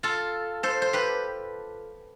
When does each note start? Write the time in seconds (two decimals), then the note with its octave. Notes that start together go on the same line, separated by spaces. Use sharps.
0.03 F4 A4
0.63 A4 C5
0.82 C5
0.93 G4 B4